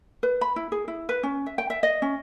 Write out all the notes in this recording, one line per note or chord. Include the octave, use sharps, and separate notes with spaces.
B4
B5
E4
G#4
E4
B4
C#4
E5
G5
E5
D#5
C#4